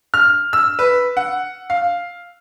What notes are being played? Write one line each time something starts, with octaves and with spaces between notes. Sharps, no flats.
F6
E6
B4
F#5
F5